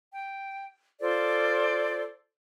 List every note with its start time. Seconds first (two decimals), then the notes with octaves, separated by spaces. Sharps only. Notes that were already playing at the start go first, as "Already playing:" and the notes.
0.12 G5
1.01 F4 A4 C5 D5